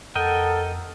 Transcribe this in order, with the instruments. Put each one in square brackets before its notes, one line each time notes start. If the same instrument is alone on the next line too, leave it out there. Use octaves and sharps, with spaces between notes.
[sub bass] F2 [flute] A4 [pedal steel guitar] A#4 D#5 G5 [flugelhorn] F#5